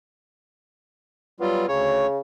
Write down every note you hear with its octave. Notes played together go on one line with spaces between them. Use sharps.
F#3 G3 B3 F4
D2 C#3 C#5